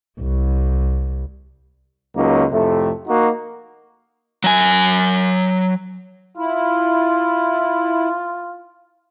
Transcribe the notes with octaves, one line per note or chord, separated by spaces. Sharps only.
C2
C#2 F#3 A#3 C#4 D#4
F2 A2 C3 A3
A#3 D#4 F#4
F#3 G#5
E4 F4